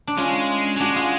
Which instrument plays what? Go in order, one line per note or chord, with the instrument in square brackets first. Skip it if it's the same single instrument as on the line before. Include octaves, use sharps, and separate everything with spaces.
[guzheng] D4
[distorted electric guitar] G#3 [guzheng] C#4 F4
[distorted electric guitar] F#3
[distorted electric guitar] G#3 [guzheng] D4 F#4
[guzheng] F4 G#4